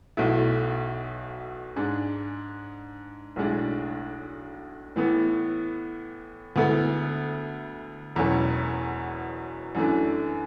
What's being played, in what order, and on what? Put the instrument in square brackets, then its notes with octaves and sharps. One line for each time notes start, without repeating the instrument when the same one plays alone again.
[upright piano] B1 B2 A3 E4
G#2 G#3 D4
B1 A2 G#3 D4
A2 E3 B3
D2 D3 G#3 B3 E4
E1 E2 B2 F#3 C#4
F#2 E3 A3 D4